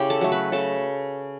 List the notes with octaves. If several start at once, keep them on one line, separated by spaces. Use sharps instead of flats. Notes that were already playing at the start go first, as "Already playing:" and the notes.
Already playing: C#3 E4 G4 G5
A4 A5
F#3 A3
B4 B5
C#3 A4 A5